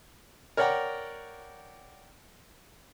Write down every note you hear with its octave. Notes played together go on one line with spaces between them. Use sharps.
A#4 C#5 D5 F#5 G5 A#5